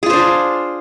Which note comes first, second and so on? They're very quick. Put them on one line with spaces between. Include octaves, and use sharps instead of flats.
G#4 F4 C5 D4